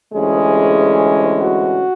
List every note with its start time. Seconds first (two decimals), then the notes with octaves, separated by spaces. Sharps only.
0.13 D2 C3 E3 G#3 C#4 G#4
1.42 F#4